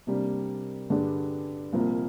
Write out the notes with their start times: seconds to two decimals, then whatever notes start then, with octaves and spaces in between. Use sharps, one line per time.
0.07 C3 G3 A#3 D4
0.90 G2 D3 G3 D4 G#4
1.73 C2 A#2 F3 A#3